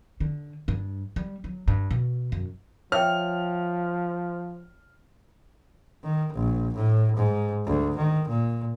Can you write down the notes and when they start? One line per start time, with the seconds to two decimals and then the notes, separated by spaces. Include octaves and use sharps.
0.20 D3
0.68 G2
1.16 G3
1.44 F#3
1.68 G2
1.91 B2
2.32 F#2
2.92 F3 C#5 E5 G5 F6
6.03 D#3
6.34 A#1
6.75 A2
7.17 G#2
7.66 D2
7.97 D#3
8.29 A#2